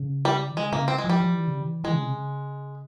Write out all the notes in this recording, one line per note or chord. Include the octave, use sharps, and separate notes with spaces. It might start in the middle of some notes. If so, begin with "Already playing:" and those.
Already playing: C#3
G3
E3
C#3 G#3
C#3 A#3
C4
G#3
F3
G3
F3
E3
C#3
E3
E3 G#3
C#3
C3
C#3